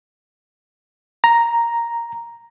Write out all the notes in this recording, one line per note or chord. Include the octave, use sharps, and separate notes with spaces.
A#5